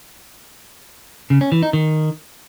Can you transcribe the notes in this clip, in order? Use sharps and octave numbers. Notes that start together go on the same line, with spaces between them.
C#3
C#4
E3
D#4
D#3